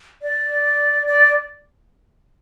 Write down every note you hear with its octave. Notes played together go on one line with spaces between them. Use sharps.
D5
D5